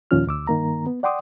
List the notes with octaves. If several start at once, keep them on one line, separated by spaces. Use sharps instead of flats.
D#2 A#2 F3 C#4 F4 F6
D2 D6 E6
G2 D#3 A#3 A#5
B3
D5 F#5 G5 C6 D6 D#6